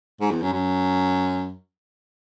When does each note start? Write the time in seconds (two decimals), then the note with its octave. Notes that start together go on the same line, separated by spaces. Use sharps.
0.21 G#2
0.31 E2
0.42 F#2
0.53 F#2